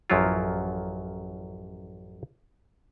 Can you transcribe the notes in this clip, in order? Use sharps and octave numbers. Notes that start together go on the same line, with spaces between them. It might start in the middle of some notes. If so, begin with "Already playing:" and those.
A1 F#2 F3 F#3 E4 F4